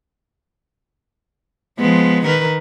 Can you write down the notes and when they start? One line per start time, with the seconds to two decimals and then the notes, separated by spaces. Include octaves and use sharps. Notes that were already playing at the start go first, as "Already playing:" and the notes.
1.79 F3 G#3 B3
2.26 D#3 A#4 B4